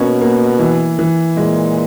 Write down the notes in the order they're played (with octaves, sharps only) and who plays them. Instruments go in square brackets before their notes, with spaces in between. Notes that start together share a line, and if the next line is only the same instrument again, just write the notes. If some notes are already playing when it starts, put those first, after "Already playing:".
Already playing: [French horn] B2 [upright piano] A#3 C#4
[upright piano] A#3
E3
E3
[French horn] A#2 [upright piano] G#3